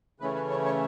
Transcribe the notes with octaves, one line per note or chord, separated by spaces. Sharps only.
C#3 E3 A3 C#4 B4
B4
C#5
C#5